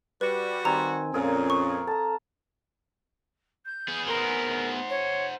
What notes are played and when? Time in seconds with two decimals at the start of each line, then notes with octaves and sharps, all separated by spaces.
0.21 G3 F#4 B4
0.65 D#3 C4 G#5 A#5
1.14 F2 A#2 C#4 G#4 A#4 F5
1.50 C#6
1.87 A4 A5 A#5
3.66 G6
3.88 B3 G#4
4.08 A#4 C5 F#5
4.89 C#5